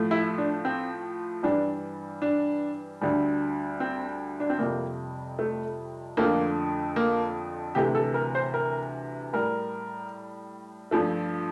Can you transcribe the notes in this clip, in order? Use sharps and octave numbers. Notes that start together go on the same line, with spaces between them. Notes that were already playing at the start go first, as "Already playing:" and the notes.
Already playing: A2 F3 A3
E4
D4
C4
G2 E3 G3 D4
D4
D2 D3 G3
C4
D4
C4
F2 C3 G3 A#3
A3
F2 D3 F3 A3 A#3
A#3
D2 C3 E3 A3 G4
A4
A#4
C5
A#4
A2 G3 A#4
G2 F3 A3